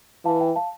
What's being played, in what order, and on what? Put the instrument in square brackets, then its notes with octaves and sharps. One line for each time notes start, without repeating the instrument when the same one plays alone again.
[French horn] E3 [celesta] F5 A5
[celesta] E5 G5
F5 A5